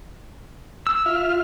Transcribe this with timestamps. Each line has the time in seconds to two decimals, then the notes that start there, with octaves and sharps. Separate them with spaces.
0.87 E6
1.06 F4 E5 F6